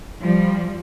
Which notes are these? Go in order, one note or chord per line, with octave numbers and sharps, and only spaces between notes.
F3 G3